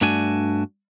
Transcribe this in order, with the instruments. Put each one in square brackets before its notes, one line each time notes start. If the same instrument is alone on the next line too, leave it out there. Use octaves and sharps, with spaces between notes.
[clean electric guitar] G2 A3 D4 F#4 G#5